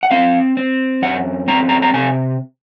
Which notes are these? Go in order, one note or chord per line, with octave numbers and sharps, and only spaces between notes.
F#5
C4 F5
C4
F#2 F#5
C4 A#5
A#5
A#5
C3 G#5